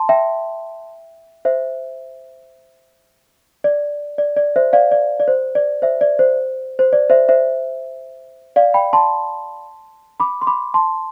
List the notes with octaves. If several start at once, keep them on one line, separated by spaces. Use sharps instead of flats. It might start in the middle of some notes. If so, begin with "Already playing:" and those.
Already playing: A5 C6
E5 G5
C5 E5
D5
D5
D5
C5 E5
D5 F5
D5
D5
C5
D5
C5 E5
D5
C5
C5
D5
C5 E5
C5 E5
D5 F5
G5 B5
A5 C6
B5 D6
C6
B5 D6
A5 C6